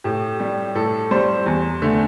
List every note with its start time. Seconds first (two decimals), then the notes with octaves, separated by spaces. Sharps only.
0.04 A2 G4
0.40 G3 G4
0.75 A2 A4
1.11 G3 C5
1.46 E2
1.82 D3 A3